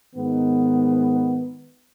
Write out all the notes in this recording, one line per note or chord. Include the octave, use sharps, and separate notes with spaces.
G#2 D#3 B3